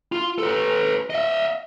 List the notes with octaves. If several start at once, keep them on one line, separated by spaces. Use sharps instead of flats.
F4
A4 B4
D#5 E5